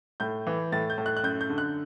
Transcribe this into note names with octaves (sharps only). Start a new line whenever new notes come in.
A2 G6
E3
A2 A6
G6
A2
F#6
F#6
F#2 G6
G6
D3
F#6